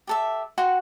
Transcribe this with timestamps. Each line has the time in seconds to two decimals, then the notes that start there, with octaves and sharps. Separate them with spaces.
0.07 G4 A4 E5
0.58 F#4 F#5 G5 C6